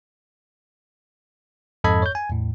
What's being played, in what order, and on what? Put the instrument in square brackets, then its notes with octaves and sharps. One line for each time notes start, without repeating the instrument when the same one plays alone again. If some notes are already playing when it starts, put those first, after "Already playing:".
[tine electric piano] F2 G#2 A4 D#5 B5 G#6
C#5 G6
G#5
E2 A2